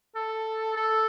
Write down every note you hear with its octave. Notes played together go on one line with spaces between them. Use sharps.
A4
A4